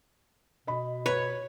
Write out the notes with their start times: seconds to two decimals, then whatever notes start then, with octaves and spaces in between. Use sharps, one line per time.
0.67 B2 D#5 B5
1.06 B4 C#5